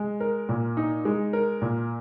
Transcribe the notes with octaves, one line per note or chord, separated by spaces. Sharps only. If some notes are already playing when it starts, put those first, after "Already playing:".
Already playing: G#3
A#4
A#2
D#4
G#3
A#4
A#2